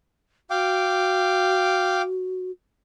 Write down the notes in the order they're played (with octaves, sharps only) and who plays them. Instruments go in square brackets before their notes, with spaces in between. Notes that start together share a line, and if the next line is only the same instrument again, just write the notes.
[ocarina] F#4 [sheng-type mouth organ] F5 G5 D6